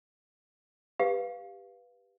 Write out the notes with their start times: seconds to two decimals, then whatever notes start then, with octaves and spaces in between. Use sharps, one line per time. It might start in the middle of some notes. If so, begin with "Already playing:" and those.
0.99 G4 B4 F5